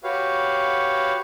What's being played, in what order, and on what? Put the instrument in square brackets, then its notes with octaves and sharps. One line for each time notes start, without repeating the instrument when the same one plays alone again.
[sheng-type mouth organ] F#4 G4 B4 C#5 F5